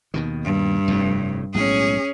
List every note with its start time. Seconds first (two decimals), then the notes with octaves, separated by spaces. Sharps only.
0.14 D#2 B2 D#3
0.44 G2
0.88 F1 F2 A2
1.54 B1 A2 G#3 C#4 G#4